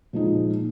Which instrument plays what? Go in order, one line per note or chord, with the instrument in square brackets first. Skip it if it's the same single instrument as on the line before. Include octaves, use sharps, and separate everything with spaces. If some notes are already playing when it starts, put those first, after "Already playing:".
[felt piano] A#2 F3 G#3 D#4